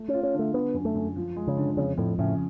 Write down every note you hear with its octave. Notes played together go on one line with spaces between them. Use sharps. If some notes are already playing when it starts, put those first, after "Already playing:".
Already playing: A3
C#4
F4
C#4
D3
A3
D3 B3
F#2
A3
F#2
F3
G#3
C#3
D3
F2 C#3
F2 A2
A2 C#3